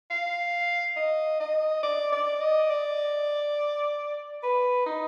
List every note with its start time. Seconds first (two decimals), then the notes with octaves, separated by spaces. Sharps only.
0.10 F5
0.97 D#5
1.40 D#5
1.83 D5
2.12 D5
2.41 D#5
2.70 D5
4.43 B4
4.86 D#4